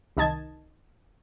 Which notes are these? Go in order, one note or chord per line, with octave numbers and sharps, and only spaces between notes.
C2 D#3 D#5 A5 G#6